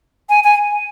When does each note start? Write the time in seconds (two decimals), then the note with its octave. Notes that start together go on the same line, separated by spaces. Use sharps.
0.29 G#5
0.44 G#5